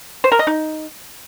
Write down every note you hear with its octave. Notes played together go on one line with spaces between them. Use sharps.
C5
A#4
D#5
D#4